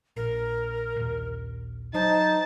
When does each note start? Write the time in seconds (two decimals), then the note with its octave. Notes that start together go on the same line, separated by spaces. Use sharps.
0.16 A#1 A#4
0.96 A#1 D#2
1.94 F#3 D#4 C5 A5